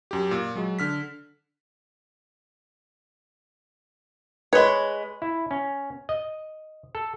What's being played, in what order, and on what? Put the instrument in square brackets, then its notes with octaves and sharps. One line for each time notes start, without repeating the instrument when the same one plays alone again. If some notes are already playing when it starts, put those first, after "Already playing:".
[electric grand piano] F#2 G4
A#2
F#3 G#3
D3 F6 B6
[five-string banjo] G#3 C#5 [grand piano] B4
[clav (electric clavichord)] E4
C#4
D#5
A4